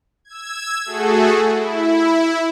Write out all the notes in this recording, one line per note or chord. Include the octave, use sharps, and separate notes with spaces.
E6 G#6
A3 F#4 G#4 A4
E4